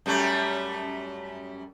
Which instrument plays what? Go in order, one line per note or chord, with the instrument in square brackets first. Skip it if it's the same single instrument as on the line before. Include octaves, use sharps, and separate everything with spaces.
[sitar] F#2 G3 A3